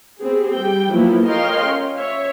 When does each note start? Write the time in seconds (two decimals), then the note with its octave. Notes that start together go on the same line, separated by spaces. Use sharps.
0.19 B3 C4 G4 G#4
0.54 G3 G4 G5
0.91 F3 F#3 A#3 B3 E4
1.25 A#4 C#5 D#5 F5 G5 C6
1.67 C#4
1.96 C#5 E5